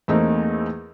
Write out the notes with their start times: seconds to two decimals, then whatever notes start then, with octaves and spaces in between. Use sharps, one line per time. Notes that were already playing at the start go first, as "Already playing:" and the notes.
0.08 E2 A3 A#3 C4 D#4